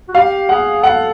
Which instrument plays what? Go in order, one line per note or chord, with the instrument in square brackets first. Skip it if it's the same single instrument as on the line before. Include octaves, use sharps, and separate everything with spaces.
[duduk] F#4
[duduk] G4 [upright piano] F5
[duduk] G#4 [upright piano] F#5
[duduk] A4 [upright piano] F#5